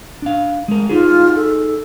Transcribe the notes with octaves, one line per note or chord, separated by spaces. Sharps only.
D4 F5
G#3 A#4
D#4 F4 G#4
A4